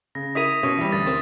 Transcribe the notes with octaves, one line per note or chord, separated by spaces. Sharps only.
C#3 A#6
E4 A#4 D#6 B6 D#7
B2 C#4
E3 G3
D2 A6
C4 A#4